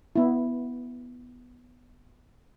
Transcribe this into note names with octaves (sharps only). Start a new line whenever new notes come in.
B3 E4